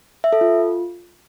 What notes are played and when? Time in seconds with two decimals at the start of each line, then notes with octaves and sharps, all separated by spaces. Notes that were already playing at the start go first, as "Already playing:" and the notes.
0.24 E5
0.33 A4
0.41 F4